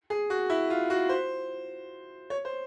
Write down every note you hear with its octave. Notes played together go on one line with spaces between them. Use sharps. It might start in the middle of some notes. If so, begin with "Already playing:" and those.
G#4
F#4
E4
F4
F#4
C5
C#5
C5